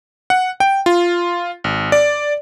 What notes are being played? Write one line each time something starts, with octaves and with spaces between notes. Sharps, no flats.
F#5
G5
F4
G#1
D5